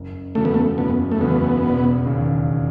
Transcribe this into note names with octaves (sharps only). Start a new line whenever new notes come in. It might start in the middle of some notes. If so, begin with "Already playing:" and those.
Already playing: F#1
E2 C#3 F#3 A3 C#4
B3
A3
F#1 B3
A3
E2 C#3 F#3 B3 C#4
E1
D#2 C#3